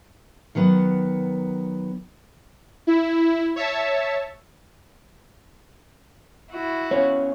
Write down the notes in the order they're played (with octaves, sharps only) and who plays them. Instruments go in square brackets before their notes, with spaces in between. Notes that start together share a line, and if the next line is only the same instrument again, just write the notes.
[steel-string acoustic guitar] D#3 F#3 B3
[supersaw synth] E4
C#5 E5 A5
[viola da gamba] E4 F#4
[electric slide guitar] B3 C#4 F5 [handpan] C#5